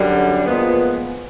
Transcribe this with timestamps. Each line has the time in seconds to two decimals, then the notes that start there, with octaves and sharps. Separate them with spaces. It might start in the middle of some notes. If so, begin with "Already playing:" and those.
Already playing: F#2 D3 G3
0.46 A#2 F3 G#3 B3